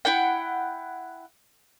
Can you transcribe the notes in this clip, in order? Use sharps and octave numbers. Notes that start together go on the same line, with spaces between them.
E4 F#5 G5